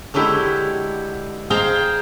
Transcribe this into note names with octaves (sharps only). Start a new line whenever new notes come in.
D3 F#3 G#3 E4 G4
G#4 C5 D#5 F5 G5 A#5